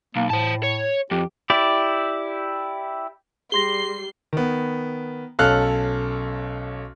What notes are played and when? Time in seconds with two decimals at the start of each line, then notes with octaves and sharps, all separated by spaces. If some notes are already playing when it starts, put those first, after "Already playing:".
0.16 B1 A#3
0.30 A2 C5 A5
0.63 C#5
1.11 F2 G4
1.50 E4 G4 D5
3.52 G3 G#4 C6 A#6 C7 G7
4.33 D#3 B3
5.39 B1 C#4 A4 F5 F6 F#6